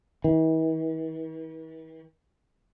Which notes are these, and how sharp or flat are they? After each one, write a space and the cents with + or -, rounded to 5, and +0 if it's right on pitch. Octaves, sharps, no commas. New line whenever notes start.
E3 -45